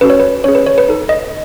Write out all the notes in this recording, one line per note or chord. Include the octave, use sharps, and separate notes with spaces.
C#4 F#4 A4 B4
C#5
B4
C#4 G#4 C#5
B4
C#5
B4
D#4 A4
D#5